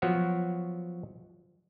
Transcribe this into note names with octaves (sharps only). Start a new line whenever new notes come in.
F3 F#3 B3 F#4 C#5